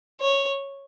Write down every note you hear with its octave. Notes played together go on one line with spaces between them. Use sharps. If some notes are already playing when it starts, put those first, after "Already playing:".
C#5